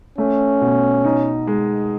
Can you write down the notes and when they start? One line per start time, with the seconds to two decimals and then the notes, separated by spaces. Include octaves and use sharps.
0.18 A3 C#4
0.61 B2
1.05 D#4
1.47 G#3